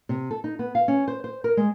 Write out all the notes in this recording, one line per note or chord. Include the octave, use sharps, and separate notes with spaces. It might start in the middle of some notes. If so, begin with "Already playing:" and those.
C3
A4
D#4
B3
F5
C#4
C5
C5
A#4
G#3